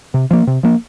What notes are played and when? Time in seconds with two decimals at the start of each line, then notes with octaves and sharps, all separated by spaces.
0.14 C3
0.31 F3 A#3
0.47 C3
0.63 F3 A#3